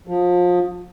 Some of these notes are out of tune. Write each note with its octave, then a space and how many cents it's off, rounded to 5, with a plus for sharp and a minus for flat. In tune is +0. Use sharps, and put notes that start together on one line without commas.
F3 +30